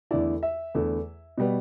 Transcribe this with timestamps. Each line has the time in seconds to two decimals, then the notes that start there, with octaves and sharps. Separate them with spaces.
0.11 E2 D3 A3 E4 D5
0.43 E5
0.75 E2 D3 A3 E4
1.38 B2 G3 B3